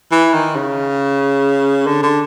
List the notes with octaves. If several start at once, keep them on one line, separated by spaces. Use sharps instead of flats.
E3
D#3
C#3
D3
D3